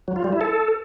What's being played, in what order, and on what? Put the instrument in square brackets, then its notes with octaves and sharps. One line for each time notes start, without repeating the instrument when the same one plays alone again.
[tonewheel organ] F#3
F4
G3
E4
A4